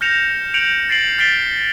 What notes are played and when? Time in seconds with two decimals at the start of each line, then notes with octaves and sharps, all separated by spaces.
0.01 F6 G6 A#6 C#7 E7 F7
0.54 G6 C#7 D7 F7 F#7
0.89 A6 C7 D7 F#7
1.18 F6 A6 B6 C7 D7 G7